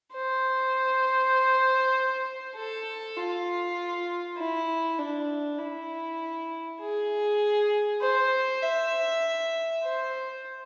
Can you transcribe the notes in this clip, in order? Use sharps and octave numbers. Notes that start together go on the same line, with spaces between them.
C5
A4
F4
E4
D4
E4
G#4
C5
E5
C5